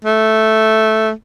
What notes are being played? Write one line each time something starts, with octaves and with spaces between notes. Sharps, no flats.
A3